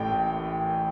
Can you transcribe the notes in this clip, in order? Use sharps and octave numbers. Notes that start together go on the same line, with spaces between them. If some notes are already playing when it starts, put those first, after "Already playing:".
Already playing: A1 A2 G5